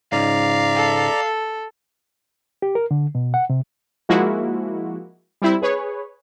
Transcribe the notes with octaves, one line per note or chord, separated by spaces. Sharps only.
C#2 G#2 D5 F5 A#5
A4
G4
A#4
D3
B2
F#5
C3
F3 G#3 A#3 E4 F#4
G3 C4 E4
G#4 B4 C#5